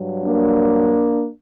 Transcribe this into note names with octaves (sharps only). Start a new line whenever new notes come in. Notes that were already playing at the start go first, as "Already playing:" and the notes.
Already playing: G2 F#3
A#3 D4